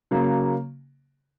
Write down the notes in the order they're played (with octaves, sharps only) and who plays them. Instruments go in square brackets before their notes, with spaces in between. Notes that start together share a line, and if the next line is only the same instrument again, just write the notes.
[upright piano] C#3 F#3 A#3